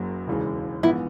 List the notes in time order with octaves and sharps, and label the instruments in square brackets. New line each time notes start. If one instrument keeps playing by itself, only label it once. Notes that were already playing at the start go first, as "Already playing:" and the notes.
Already playing: [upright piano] F#1 F#2 C#3 F#3 A#3
E1 D#2 C#3 E3 G#3
[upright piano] A#1 G#2 E3 B3 [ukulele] E4